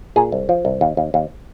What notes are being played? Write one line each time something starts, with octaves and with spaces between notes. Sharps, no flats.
A#2 G#4
C2
F3
C2
D#2
D#2
D#2